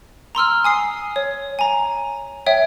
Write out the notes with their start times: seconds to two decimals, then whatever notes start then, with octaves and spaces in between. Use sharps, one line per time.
0.35 A#5 C6 E6 F6
0.65 G#5 D#6 C7
1.16 C#5
1.59 G#5 A#5
2.46 C#5 E5 G5